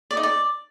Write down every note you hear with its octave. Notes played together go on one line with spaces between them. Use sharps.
D5
D#4
D5